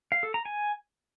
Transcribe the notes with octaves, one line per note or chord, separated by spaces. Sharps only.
F5
A4
A#5
G#5